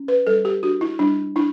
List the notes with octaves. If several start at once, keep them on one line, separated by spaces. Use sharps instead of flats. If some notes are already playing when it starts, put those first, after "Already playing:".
Already playing: C#4
B4
G3 A4
G4
D4 F#4
E4
G3 D4
D4 E4